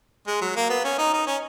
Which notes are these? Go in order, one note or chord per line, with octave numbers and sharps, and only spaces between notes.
G#3
F#3
A#3
B3
C#4
D#4
D#4
C#4